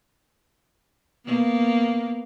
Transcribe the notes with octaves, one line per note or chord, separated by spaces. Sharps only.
A#3 B3